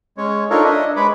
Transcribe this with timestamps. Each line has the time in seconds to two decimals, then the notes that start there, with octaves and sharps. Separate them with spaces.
0.18 G#3 C#4 C#5
0.50 D4 D#4 F4 A4 A#4 C#5
0.64 D4 D#5 E5
0.96 G#3 B4 C#5 B5 D6